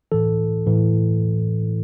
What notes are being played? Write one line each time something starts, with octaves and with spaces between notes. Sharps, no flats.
A2 E3 A4
A2 E3